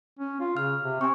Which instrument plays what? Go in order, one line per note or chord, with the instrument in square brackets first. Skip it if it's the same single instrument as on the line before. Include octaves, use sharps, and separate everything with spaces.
[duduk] C#4
F4
[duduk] C#3 [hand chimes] F6
[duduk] C3
[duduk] C4 [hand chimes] G#5 C#6